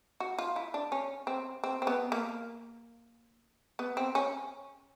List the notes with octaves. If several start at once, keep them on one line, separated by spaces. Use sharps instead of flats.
F#4
F4
E4
D4
C#4
C4
C4
C4
B3
A#3
B3
C4
C#4